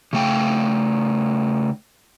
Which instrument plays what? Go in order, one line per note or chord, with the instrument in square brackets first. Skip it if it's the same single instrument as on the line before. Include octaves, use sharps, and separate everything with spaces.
[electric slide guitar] C#3 A3 G5